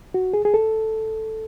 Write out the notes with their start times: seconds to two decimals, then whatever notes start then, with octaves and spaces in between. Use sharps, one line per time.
0.14 F#4
0.34 G#4
0.45 G#4
0.54 A4